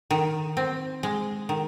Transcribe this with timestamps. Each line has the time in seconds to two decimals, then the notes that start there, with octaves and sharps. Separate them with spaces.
0.11 D#3
0.57 C4
1.03 G#3
1.49 D#3